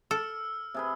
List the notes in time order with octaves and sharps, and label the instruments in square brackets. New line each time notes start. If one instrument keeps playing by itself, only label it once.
[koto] A4 [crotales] E6 F6
[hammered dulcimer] C3 G#4 B4